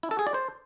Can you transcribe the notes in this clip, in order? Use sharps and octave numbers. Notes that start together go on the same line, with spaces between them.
E4
A4
G#4
D5
C5